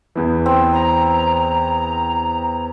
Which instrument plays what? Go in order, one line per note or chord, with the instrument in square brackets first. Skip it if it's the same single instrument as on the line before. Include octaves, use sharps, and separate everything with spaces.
[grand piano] E2 E3
[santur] C4
[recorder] A#5